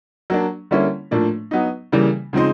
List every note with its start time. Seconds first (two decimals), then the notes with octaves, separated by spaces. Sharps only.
0.30 F#3 A#3 D4
0.71 D3 G3 A#3 C#4 E4
1.11 A2 F3 A#3 D4
1.51 F#3 B3 D#4
1.92 C#3 E3 G3 A#3
2.33 C#3 F3 G#3 C4 D#4